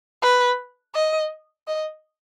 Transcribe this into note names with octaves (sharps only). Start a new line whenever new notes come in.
B4
D#5
D#5